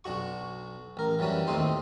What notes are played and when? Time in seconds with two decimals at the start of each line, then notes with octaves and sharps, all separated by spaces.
0.04 B1 D4 F#4 C#6
0.97 A1 A#4
1.19 E3 F#3 G3 C#4 D4
1.47 D#2 A2 C4 D#4 C5